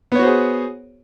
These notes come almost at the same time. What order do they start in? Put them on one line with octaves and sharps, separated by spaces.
B3 C#5 F#4 C5 G#4